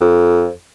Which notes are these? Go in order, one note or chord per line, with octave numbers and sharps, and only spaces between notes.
F2